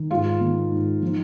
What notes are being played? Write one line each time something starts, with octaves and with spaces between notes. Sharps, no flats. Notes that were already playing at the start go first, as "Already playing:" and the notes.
Already playing: D#3
G#2 F4
D#3
G#2
F3 D#4